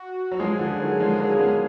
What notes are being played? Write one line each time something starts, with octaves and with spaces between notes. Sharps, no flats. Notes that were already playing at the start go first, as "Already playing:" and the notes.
Already playing: F#4
F#3
F3 G#3 G#4
D3 F3
D#3 F#3
F3 G#3
F#3 A#3
A#3
G#3 B3